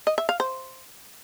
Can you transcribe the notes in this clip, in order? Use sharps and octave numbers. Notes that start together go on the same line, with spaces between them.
D#5
E5
F5
C5